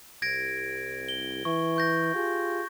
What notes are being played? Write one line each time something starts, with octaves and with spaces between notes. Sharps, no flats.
C2 G#6 A#6 D7
G7
E3 C#6
C#6 G6 A#6
F4 G4 G#4